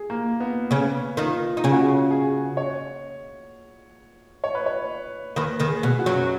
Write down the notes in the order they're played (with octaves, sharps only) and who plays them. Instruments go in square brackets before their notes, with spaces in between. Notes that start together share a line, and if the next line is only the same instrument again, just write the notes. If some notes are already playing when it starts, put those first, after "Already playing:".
Already playing: [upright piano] G#4
A#3
B3
[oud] C#3 C#4 [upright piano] B3
[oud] D#3 D#4 [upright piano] F4
[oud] D#4
[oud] C#3 C#4 [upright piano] G#4
[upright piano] F#4
G#4
G#4
C#5
C#5
B4
C#5
[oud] D#2 D#3 [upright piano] B4
[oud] D#2 D#3
[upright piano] G#4
[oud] B2
[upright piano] G#4
F#4
[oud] F#2 F#3